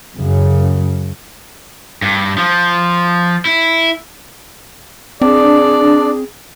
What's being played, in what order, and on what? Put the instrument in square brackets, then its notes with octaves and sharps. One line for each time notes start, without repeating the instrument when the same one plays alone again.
[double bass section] F#2 C#3
[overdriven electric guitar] G2
F3
E4
[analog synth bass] C4 [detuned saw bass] D4 [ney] G#4 [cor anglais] D5